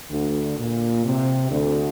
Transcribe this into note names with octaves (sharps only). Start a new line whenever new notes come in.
D2 D3
A#2
C3
D2 D3